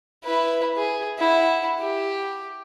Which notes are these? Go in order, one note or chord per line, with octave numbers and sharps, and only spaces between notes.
E4 B4
G#4
E4 F#5
G4